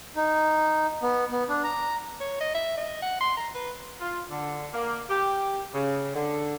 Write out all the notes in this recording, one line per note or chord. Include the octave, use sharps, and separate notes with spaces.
D#4
B3
B3
D4
A#5
C#5
D#5
E5
D#5
F#5
C6
A#5
B4
F4
D3
A#3
G4
C#3
D3